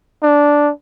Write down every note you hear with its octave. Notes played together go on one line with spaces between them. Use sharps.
D4